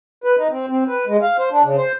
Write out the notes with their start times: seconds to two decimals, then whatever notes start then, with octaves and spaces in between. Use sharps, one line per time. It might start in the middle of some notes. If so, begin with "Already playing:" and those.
0.24 B4
0.38 D#4
0.51 C4
0.69 C4
0.88 B4
1.07 G#3
1.22 F5
1.39 C5
1.51 D4
1.63 C#3
1.78 C5